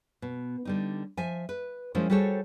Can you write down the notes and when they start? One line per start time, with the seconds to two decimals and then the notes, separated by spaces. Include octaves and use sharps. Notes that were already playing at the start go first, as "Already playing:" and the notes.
0.22 B2
0.65 D3 G3 D#4
1.17 F3 E5 G#5
1.49 B4
1.95 F3 G#3 C#4 E4 A#4 C5
2.10 G3 F#4 G#4 A4 C5 C#5